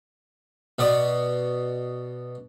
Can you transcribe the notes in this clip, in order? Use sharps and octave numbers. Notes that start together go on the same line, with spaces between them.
B2 B3 D5